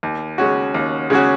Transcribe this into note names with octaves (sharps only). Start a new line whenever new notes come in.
D#2
C#3 G#3 C#4 F#4
D#2
C#3 G#3 C#4 F#4